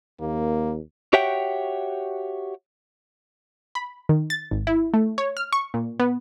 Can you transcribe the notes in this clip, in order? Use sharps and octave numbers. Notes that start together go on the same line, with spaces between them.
D#2 A#3
F#4 G4 C#5 E5 F#5 G5
B5
D#3
A6
G#1
E4
A3
C#5
F6
C#6
A#2
B3